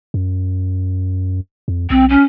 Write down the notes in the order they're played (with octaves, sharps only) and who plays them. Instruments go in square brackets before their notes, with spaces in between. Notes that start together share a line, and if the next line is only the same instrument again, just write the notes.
[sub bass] F#2
F2
[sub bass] B1 [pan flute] C4
[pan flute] C#4